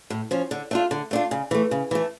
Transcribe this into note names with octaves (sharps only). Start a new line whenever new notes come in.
A2
F3 C#4
D3
A3 D4 F4
D3
A3 D4 F4
C#3
E3 A3
C#3
E3 A3